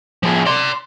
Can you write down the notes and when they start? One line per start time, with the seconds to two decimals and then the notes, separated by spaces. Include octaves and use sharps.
0.23 F3 G#4
0.46 D5 C6